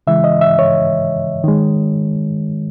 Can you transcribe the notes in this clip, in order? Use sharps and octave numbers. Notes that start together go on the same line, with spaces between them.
C#3 E3 G#3 E5
D#5
E5
C#5
D#3 G#3